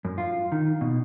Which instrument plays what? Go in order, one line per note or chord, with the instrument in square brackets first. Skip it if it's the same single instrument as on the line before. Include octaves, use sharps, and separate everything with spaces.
[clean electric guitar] F#2
F4
D#3
B2